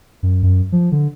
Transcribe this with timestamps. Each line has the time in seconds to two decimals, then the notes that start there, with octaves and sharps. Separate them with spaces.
0.23 F#2
0.43 F#2
0.72 F3
0.92 D3